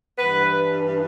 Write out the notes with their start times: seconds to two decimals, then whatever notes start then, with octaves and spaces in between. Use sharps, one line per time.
0.19 G2 E3 B4